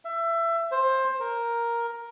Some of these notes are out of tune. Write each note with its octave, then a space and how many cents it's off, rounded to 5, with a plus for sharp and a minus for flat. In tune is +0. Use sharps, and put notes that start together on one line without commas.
E5 +25
C5 +15
A#4 +5